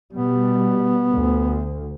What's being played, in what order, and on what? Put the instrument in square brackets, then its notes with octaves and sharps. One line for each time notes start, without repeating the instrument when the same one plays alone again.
[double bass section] B2 G3 [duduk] B3
[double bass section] D2